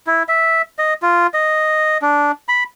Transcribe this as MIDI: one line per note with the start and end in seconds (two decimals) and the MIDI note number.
0.07 0.23 64
0.29 0.62 76
0.79 0.94 75
1.03 1.27 65
1.34 1.98 75
2.02 2.32 62
2.49 2.64 83